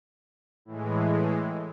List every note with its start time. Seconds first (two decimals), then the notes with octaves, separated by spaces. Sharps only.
0.65 A2 E3 G#3